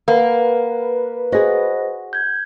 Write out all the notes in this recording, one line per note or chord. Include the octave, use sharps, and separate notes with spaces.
A#3 B4 F#5
F#4 G#4 C5 D#5 A#6
G6 G#6